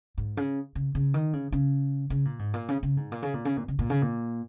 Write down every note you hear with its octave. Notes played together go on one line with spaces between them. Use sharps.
G#2
C#3
C#3
C#3
D#3
C#3
C#3
C#3
A#2
G#2
A#2
C#3
C#3
G#2
A#2
C#3
A#2
C#3
A#2
C#3
A#2
C#3
A#2